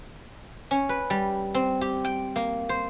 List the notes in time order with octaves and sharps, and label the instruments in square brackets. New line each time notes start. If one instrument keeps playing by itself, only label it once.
[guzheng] C#4
B4
G3
C4
G4
G5
A#3
C5